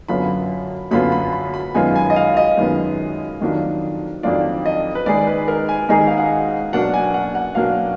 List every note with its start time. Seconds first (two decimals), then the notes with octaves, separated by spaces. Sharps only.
0.09 F#2 D3 F#3 B3 F4 B5
0.91 F#2 D3 F#3 B3 F4 B5
1.12 B5
1.33 B5
1.54 B5
1.74 F#2 D#3 G#3 B3 F4 G#5
1.96 G#5
2.10 D#5
2.16 F5
2.37 D#5
2.57 F#2 D#3 G#3 B3 F4
3.41 F2 D#3 F#3 D4 F4
4.23 F2 D#3 F#3 D4 F4 D5
4.66 D#5
4.95 B4
5.06 G#2 D#3 G#3 D#4 G#4 D5
5.27 B4
5.48 A#4
5.69 G#5
5.89 G#2 D#3 G#3 D#4 G#4 A#5
6.07 F5
6.18 F#5
6.73 B2 F#3 A#3 D4 F#5
6.94 G#5
7.14 F#5
7.35 F#5
7.55 B2 F#3 A#3 D4 F5